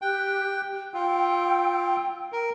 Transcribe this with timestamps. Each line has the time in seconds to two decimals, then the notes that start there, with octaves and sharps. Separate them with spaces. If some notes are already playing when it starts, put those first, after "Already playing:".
0.02 G4 G5 F#6
0.94 F4 G5 E6
2.32 A#4